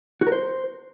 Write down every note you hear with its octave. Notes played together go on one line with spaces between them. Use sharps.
F#4
A#4
C5